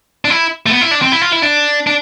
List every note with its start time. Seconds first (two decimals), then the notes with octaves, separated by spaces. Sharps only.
0.25 D4
0.30 E4
0.66 A3
0.71 B3
0.81 E4
0.91 D4
1.02 C4
1.12 E4
1.21 F4
1.32 E4
1.42 D4
1.87 D4